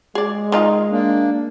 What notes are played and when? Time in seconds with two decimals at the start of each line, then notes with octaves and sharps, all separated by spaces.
0.15 G#3 G#4 D5
0.52 D#3 D#4 F4
0.91 A#3 D4